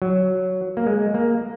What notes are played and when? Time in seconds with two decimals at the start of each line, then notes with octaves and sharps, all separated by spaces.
0.02 F#3
0.77 A#3
0.86 G#3
1.15 A#3